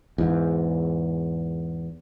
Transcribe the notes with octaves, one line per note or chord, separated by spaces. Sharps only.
E2 G#2